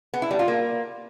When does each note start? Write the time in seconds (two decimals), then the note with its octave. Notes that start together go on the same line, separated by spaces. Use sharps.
0.14 B3
0.22 E4
0.31 G3
0.39 F4
0.48 A#3